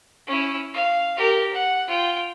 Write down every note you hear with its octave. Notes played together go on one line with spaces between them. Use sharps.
C#4 E4
F5
G4 A#4
F#5
F4 G5